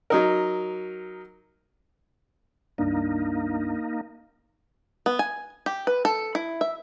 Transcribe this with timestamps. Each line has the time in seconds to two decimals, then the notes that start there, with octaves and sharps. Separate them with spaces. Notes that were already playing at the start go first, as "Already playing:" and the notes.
0.10 F#3 D#4 A#4
2.78 C#2 G2 A#3 D4 D#4
5.06 B3
5.19 G#5
5.66 G4
5.87 B4
6.05 A4
6.35 E4
6.61 E5